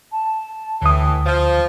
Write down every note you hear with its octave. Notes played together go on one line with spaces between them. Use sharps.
A5
D2 A2 E3 D#6
F3